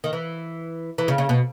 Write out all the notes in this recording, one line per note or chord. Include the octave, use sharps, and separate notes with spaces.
D#3
E3
E3
C#3
C#3
B2